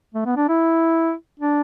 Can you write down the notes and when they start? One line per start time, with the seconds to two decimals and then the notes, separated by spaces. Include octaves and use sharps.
0.15 A3
0.26 B3
0.36 D4
0.49 E4
1.40 D4